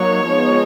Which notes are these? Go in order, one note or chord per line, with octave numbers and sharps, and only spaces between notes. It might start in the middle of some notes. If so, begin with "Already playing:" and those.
Already playing: F#3 A#3 D#4 C#5
F3 G#3 B3 D#4